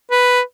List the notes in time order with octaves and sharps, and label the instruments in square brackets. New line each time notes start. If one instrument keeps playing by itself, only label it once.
[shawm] B4